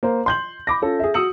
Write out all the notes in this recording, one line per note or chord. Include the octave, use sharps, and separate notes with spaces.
A#3 C5
C6 G6 F#7
B5 D6 A#6
C#4 F4 A4
G#4 E5
F#4 D#6 E6 C#7 F#7